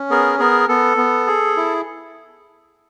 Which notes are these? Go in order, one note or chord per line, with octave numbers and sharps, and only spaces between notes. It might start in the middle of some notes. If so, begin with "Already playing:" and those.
Already playing: C#4
B3 G#4 A#4
B3 G#4 A#4
B3 A4
B3
G#4
E4